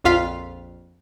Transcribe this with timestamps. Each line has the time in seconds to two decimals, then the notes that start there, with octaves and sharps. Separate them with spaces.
0.04 A#1 F2 F4 F5 B6